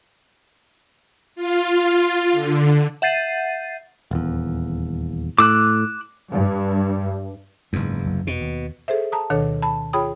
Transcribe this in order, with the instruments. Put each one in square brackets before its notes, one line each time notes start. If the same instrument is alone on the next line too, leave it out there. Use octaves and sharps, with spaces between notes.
[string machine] F4
D3
[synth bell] E5 F#5 G6 A6 C7 D#7
[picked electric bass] D#1 E2
[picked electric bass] A2 [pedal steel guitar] D6 E6 F#6
[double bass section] G2
[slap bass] F#1 E2 [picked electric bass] G#2
[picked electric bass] C2 F#2
[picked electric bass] F1 [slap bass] B2
[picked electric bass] D#2
[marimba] G#4 A4 C5 E5
A5 A#5 D#6
D2 B2 D#3 D4 A4 C#5
A5 B5
F4 G#4 C#5 G5 B5 D#6